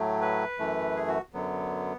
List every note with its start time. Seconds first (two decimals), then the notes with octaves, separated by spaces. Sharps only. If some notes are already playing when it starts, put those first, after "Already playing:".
Already playing: A2 F#3 A3
0.21 B4
0.59 F#2 E3 A3
0.96 G#4
1.08 F#4
1.34 F#2 D3 F#3 B3